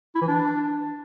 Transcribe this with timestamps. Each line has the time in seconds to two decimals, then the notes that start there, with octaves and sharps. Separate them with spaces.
0.15 E4
0.22 E3
0.28 D4